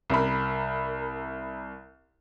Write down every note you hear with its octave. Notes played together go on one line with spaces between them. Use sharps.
C2 A#4 B5